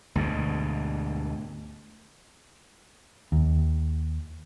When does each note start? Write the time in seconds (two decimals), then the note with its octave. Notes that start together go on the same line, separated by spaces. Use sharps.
0.15 D2 G#2 B2
3.32 D#2